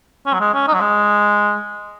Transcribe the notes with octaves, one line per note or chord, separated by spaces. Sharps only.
C#4
F#3
G#3
C#4
D#4
F#3
G#3